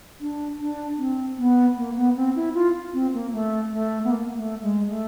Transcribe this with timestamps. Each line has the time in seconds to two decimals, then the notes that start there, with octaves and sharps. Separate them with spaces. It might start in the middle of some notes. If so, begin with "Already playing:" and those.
0.21 D4
0.60 D4
0.98 C4
1.38 B3
1.77 A#3
1.96 B3
2.16 C4
2.36 E4
2.54 F4
2.93 C4
3.14 A#3
3.33 A3
3.72 A3
4.04 B3
4.11 A#3
4.37 A3
4.62 G#3
4.88 A3